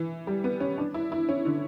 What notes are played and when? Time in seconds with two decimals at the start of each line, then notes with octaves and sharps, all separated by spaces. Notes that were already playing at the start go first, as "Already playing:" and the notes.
Already playing: E3
0.27 G3
0.44 B3
0.60 C#4
0.78 D4
0.94 E4
1.12 E4
1.29 C#4
1.46 D3